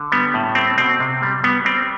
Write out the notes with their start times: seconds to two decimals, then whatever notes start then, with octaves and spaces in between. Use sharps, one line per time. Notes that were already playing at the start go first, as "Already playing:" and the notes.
Already playing: D3
0.12 G3 B3
0.34 A2
0.55 A3 C4
0.78 B2 C4
1.00 C3
1.22 G3
1.44 G3 B3
1.65 G3 C4